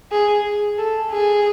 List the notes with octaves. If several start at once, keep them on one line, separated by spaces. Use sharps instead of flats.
G#4
A4
G#4